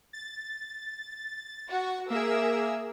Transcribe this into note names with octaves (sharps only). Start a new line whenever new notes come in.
A6
F#4 F#5 C#6
A#3 G#4 A#4 E5 E6